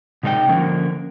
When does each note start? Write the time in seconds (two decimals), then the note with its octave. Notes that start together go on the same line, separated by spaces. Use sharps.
0.23 C3 G#3 D#4 B4 G5
0.49 D3 F3 A#3 C#4